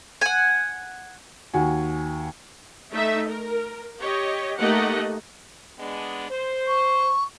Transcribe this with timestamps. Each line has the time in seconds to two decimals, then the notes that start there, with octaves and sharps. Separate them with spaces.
0.21 F#5 G#5
1.54 D#2 F#4 G#5
2.91 A3 D#4 E5
3.27 A#4
4.00 G4 C#5 D#5
4.58 A3 A#3 D#4 G4 D#5 F#5
5.79 G#3 B3 D4
6.31 C5
6.67 C#6